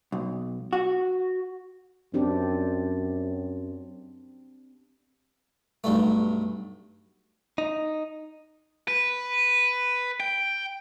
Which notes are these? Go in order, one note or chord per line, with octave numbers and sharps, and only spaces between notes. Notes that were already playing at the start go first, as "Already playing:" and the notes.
B1
F#4
F#2 C4 D4 G4
B1 G2 A3
D#4
B4
G5